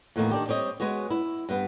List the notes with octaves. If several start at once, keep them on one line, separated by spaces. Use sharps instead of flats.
E2 A2 D#3 A#3
D#3 D4 G4
G3 C4 C#5 D#5
G#3 B3 F#4 C#5
E4
G2 G3 B3